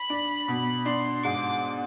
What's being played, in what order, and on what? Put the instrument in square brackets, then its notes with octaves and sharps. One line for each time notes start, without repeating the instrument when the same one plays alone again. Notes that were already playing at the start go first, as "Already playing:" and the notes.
Already playing: [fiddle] B5
[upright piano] D4
B2
[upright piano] D4 [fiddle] C6
[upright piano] G#2 [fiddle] D6